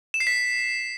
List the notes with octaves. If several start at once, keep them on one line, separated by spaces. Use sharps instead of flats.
E7
C7
B6